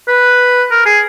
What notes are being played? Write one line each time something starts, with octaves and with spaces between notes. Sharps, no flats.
B4
A#4
G#4